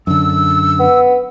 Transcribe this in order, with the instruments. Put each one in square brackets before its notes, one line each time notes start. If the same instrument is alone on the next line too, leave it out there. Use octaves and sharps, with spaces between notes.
[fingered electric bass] F#2 D3 [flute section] E6
[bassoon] B3